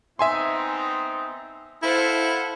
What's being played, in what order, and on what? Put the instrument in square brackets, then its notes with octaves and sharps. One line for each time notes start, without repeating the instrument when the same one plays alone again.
[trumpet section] B3 C4 D#4 [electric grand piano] E5 G#5 C6
[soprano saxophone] E4 [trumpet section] A4 F5 [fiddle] C5 F#5